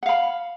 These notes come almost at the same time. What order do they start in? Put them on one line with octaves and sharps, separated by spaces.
F#5 F5 B5